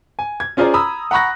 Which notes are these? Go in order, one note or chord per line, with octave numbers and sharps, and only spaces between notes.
G#5
G#6
C#4 F4 G#4 C5 D5 A#5
A#5 B5 D#6 E6
F#5 A#5 B5 C#6 F#6 A#6